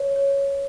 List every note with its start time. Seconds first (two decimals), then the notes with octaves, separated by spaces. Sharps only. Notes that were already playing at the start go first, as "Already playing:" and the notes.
Already playing: B4 C#5
0.16 C#5